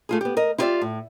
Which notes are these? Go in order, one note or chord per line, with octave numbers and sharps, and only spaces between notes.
A3 F4 G#4
B3 G4
A#4 D#5
E4 F4 G4 A#4 D5 E5
A2